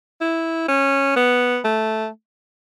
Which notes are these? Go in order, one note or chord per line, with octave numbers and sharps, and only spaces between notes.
E4
C#4
B3
A3